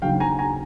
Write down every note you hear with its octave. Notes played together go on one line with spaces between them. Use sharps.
D#2 C#3 F#3 F5 G5
G#5 A#5
G#5 A#5